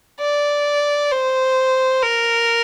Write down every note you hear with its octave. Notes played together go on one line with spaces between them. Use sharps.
D5
C5
A#4